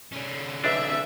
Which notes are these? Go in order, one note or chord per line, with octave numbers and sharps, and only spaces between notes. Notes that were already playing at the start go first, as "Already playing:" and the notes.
D3 C#4
B1 D4 E5 E6